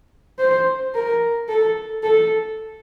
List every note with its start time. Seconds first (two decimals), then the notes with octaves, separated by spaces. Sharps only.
0.39 C5
0.95 A#4
1.49 A4
2.03 A4